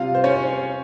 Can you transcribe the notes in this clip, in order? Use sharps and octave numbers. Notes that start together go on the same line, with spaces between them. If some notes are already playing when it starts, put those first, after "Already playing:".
Already playing: C3 G3 C4 F4 F5
C5
C#4 C#5